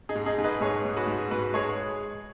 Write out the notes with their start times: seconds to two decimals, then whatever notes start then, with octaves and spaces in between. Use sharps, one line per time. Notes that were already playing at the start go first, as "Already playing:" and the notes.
0.09 D#4 G#4
0.15 G#2
0.26 D#4 G#4
0.38 G#2
0.44 B4 D#5
0.61 G#2 G#4 C#5
0.85 G#2
0.96 F#4 B4
1.07 G#2
1.31 G#2 F#4 B4
1.54 G#3 G#4 C#5